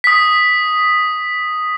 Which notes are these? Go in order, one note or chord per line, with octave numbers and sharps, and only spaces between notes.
D#6 B6